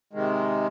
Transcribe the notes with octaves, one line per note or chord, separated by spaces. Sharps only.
C3 D#3 G#3